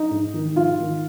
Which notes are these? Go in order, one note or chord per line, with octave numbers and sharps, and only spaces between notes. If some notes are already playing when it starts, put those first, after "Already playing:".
Already playing: D#4
G#2
D#3
G#2 F4
D#3